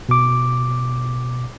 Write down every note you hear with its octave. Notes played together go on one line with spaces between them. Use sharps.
B2 D6